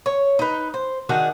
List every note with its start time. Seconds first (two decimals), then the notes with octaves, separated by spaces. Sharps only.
0.06 C#5
0.39 D#4 B4
0.74 C5
1.09 D#3 D4 F#4 G#4